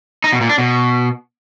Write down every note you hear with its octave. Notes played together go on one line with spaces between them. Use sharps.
D#4
B2
A#2
D4
B2